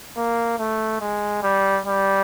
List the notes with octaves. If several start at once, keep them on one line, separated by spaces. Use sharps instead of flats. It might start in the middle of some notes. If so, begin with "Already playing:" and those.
A#3
A3
G#3
G3
G3